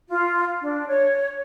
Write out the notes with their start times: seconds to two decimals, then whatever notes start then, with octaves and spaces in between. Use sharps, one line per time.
0.09 F4
0.60 D4
0.87 C#5